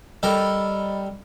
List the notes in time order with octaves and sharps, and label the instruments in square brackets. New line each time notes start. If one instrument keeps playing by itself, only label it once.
[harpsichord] G3 A4 A#4 [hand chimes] D#5 B5